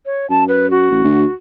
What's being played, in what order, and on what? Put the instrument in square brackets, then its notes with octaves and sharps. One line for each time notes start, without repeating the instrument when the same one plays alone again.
[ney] C#5
[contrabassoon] F#2 [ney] A5
[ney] B4
F#4
[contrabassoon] A1
D2